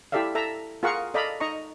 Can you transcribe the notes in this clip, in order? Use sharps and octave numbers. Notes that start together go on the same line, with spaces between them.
E4 G4 A4 D5 E5 F5
A4 E5 A#5
F4 G#4 A#4 F5 F#5 C#6
A4 D5 D#5 F5 A#5 B5
D#4 D#5 A#5 C#6